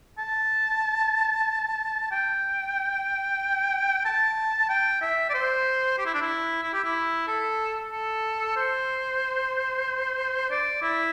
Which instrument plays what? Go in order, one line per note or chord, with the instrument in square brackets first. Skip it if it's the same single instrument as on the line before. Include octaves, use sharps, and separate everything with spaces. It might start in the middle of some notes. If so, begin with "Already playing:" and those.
[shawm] A5
G5
A5
G5
E5
D5
C5
G4
E4
D4
E4
E4
G4
E4
A4
A4
C5
D5
E4